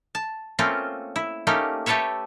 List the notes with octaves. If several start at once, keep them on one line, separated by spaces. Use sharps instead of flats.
A5
A3 A#3 C4 C#4 F4
E4
A3 A#3 C#4 D#4 G4
A3 G4 A4 B4 C#5 E5